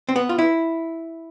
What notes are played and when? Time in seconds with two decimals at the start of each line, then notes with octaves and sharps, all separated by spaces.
0.09 C4
0.16 B3
0.29 F4
0.39 E4